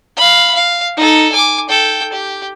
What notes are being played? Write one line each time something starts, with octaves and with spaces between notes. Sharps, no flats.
F5 B5
F5
D#4 A4
G#5 D6
A4 G5
G4